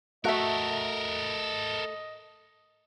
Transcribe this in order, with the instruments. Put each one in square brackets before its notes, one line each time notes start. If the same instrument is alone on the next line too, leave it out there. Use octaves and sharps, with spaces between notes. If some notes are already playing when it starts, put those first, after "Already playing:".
[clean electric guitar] A3 [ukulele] F#4 E5 [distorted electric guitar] A4 A#4 [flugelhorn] D#5